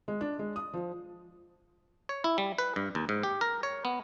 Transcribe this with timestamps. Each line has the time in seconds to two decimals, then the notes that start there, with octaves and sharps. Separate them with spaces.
0.08 G#3
0.21 D4
0.39 G#3
0.56 D#6
0.73 F3
2.09 C#5
2.24 E4
2.38 G3
2.58 B4
2.76 G2
2.95 D#2
3.09 G#2
3.23 G4
3.41 A#4
3.63 C#5
3.85 B3